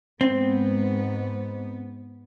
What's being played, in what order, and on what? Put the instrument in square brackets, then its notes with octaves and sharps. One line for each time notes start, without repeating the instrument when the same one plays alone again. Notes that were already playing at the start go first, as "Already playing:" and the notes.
[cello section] G#2 B3 [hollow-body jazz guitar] C4